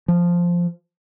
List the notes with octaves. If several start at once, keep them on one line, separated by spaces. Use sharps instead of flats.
F3